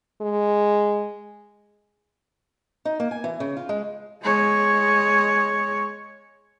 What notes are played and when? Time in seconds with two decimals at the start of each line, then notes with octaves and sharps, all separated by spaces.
0.21 G#3
2.85 D#4
3.00 A#3
3.11 G#5
3.24 E3
3.40 C#3
3.57 F4
3.69 G#3
4.23 G#3 C#5